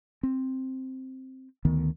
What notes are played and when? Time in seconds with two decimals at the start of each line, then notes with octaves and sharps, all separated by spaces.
0.23 C4
1.65 D2 D#3 B3